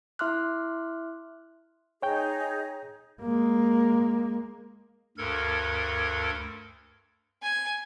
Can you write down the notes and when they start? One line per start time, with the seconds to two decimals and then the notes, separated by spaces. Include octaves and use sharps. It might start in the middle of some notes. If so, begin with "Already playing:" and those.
0.19 E4 E5 C6 D6 F6 F#6
2.02 D#4 G#4 C#5 G5 G6
3.21 G#3 A#3
5.18 D2 G2 A4 A#4 G#6
7.43 G#5